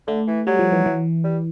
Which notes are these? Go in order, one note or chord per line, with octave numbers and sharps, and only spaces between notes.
D3 A3
E3
F#3 G3
F3
E3
E3
G3